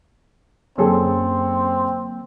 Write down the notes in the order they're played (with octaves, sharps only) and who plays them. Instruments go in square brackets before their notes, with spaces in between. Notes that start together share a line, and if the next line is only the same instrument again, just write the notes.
[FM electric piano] F#2 [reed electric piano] D3 F#3 A#3 [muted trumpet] C4 [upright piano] C#4 G#4 A4